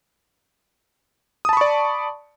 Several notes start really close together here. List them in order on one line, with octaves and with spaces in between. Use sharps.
D#6 A5 B5 C#6 D5